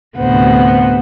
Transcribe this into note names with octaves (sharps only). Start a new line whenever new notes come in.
D2 A2 C3 B3 C5 F#5